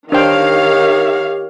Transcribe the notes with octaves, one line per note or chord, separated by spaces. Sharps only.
D#3 D4 G4 C5 C#5 F5 G5